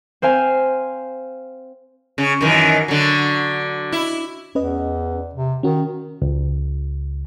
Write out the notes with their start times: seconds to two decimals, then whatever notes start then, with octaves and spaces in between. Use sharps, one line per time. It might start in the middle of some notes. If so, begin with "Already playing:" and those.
0.22 C4 C5 F5 G#5
2.18 C#3
2.41 F#2 D#3 E3
2.88 D3 F#3
3.92 E4
4.55 E2 C#4 B4 D#5
5.33 C3
5.63 D#3 C#4 F#4
6.22 C#2